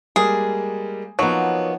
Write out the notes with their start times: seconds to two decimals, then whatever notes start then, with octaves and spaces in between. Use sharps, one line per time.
0.16 G3 G#3 A#3 G#4
1.19 F3 F#3 A#3 B3 D#4 C#5